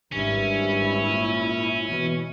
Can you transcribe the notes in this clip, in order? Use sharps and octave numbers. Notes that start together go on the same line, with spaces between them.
G#1 G2 C#4 E4
A#2
B2 E3